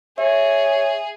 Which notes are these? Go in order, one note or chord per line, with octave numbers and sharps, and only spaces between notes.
G#4 C#5 E5